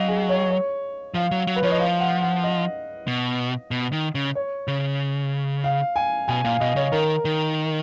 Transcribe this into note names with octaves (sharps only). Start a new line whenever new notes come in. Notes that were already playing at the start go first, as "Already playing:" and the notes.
Already playing: F#3 D#5 F5
G#4
C#5
C#5
F3 F5
F#3
F#3
B4
F3 C#5
D#5
F5
F#5
F#5
D#5
B2
B2
D#3
C#3
C#5
C#3
F5
G#5
B2 G#5
A#2 F5
B2 D#5
C#3 C#5
D#3 A#4
D#3